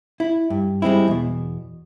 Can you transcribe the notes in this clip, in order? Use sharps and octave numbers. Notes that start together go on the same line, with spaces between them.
E4
G2
G3 G#3 C4 E4
E2 B2